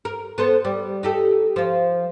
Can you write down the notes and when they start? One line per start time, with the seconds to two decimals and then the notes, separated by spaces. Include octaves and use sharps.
0.05 A#4
0.38 B3 A4 C5
0.65 G3
1.03 D#4 G4 A4
1.56 F3 F4